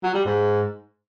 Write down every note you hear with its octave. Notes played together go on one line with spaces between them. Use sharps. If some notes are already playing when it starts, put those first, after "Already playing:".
F#3
G3
G#2